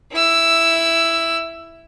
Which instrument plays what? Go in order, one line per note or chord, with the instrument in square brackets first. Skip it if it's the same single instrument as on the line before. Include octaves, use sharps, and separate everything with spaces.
[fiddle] E4 E6